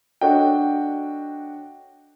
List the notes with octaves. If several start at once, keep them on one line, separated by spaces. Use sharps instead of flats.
D4 F#4 A4 C#5 D#5 G5